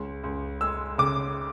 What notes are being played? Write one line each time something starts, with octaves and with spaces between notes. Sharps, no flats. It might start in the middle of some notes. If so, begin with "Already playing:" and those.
Already playing: C#2
C#2
G#3 E6
C#3 D6